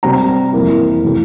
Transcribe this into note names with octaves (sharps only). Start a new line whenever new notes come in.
C3 G3 C4 A#5
F2 E3 A#3 E4
C3 E3 A3